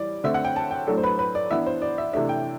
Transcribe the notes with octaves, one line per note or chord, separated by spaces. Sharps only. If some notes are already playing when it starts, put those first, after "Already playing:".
Already playing: E3 G3 D5
D3 A3 C4 E5
F#5
G5
A5
G5
A2 F#3 A3 D4 A4
C5
B4
B4
D5
E3 B3 D4 E5
C5
D5
E5
C3 E3 A3 D4 E5
G5